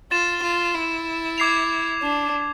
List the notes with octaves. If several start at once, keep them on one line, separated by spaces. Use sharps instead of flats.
F4 A6 E7
F4
E4
D6 G#6 C7 F7
D4